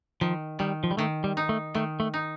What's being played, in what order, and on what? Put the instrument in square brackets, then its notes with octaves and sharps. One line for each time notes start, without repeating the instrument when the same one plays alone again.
[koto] D#3 [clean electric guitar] F3
[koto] D#3 [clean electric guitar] G3
[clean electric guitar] F3
G3
[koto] D#3 [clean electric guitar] A3
[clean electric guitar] G3
[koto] D#4
[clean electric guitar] A3
[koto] D#3 [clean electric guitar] A3
[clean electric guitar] A3
[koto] D#4